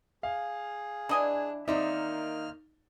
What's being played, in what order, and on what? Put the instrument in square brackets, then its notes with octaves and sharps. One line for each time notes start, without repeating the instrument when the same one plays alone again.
[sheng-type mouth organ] G#4 [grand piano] F5
[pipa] E3 D#5 G#5 [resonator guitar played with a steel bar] D4
[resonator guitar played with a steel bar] D#3 C4 E5 [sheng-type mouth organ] A#3 F6 [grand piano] D#4 D5